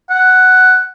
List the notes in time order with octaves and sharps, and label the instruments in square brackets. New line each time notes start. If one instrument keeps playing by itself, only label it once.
[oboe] F#5